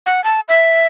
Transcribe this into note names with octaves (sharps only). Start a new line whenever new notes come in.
F#5
A5
E5